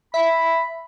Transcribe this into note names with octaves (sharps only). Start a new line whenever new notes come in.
E5 B5